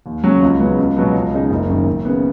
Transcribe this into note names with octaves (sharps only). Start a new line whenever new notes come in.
D#2
C#3 F#3 C#4
C#2
C#3 F#3 B3
C#2
B2 F#3 B3
C#2
C#3 G#3 D#4
F#1
F#2 D#3
F#1
C#3 B3